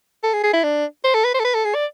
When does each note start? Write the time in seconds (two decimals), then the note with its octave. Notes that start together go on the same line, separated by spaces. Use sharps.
0.24 A4
0.33 G#4
0.43 G#4
0.54 E4
0.64 D4
1.04 C5
1.14 A4
1.24 B4
1.35 C5
1.40 A4
1.45 B4
1.54 A4
1.65 G#4
1.75 D5